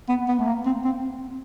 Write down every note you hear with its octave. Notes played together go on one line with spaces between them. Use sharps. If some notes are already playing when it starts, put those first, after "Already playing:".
B3
B3
A3
A#3
C4
C4